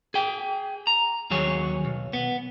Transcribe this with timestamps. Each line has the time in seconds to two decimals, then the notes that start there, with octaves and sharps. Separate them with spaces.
0.14 G#4 G5
0.87 A#5
1.30 D#2 F#3 G#4 C#5
1.85 B1
2.13 B3